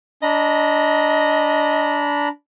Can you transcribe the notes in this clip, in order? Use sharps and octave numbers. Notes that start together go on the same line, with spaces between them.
D4 D#5 A#5 B5